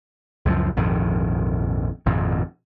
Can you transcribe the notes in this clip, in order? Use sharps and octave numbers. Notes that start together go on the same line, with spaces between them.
C#2 F#2 E3 F3
A#1 F2 G#2 D#3
G#1 F2 A#2